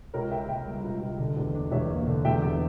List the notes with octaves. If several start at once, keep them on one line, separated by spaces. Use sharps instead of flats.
C#2 A#4 C#5
C#3 E5 G5
C#3 E5 G5
G3
C#2
C#2
D3
E2
D4
E2 C#5 E5
A#3
D3
E2 E5 G5
E2